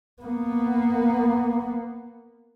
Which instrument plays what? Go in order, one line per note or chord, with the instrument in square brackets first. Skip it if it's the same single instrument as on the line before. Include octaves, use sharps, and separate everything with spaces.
[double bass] A#3 B3